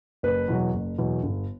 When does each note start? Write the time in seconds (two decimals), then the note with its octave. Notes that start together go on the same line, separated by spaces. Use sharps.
0.23 F#1 B4
0.48 E2 B2 F#3
0.74 F#1
0.98 E2 B2 F#3
1.23 G1